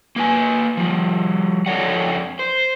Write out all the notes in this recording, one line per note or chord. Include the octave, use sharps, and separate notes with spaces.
A#3 B4 G#5
F3 G3
F2 E3 A4 C#5 D5 F#5
C5